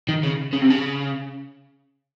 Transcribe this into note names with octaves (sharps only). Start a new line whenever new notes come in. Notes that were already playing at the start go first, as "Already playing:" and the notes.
D#3
C#3
C#3
C3
C#3